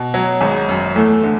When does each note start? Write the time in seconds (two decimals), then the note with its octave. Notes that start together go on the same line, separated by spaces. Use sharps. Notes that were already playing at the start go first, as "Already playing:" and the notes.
Already playing: B2
0.14 F#3
0.41 G#1 G#3
0.69 F#2
0.96 E2 A3
1.23 D3